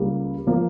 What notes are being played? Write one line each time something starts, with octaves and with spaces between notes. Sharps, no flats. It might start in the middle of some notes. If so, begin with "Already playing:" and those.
Already playing: C#2 C#3 G3 A#3
F3 A#3